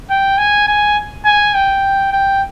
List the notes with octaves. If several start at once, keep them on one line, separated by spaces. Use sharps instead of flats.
G5
G#5
G#5
G#5
G5
G5